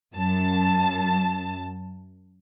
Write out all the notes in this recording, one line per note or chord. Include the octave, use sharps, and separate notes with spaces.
F#2 A5